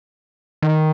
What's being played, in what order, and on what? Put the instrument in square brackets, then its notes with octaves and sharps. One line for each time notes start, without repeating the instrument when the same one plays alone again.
[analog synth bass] D#3